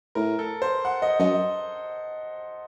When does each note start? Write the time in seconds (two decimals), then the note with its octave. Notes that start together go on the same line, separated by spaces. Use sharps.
0.15 A2 A#4
0.39 A4
0.62 C5
0.85 F#5
1.02 D#5
1.19 F#2 D#5